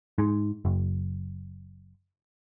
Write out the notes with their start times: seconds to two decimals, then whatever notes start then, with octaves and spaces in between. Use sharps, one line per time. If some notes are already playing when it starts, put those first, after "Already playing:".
0.18 G#2
0.65 F#1